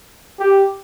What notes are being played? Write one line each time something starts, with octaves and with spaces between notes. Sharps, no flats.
G4